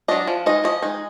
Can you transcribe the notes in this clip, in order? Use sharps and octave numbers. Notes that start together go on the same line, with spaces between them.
F#3 D4 D#5
F3
G#3 D#4 D#5
F3 D#5
G#3 D#4